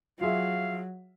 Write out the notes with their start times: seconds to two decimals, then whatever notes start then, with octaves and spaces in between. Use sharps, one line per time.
0.21 F#3 F4 G#4 E5 F5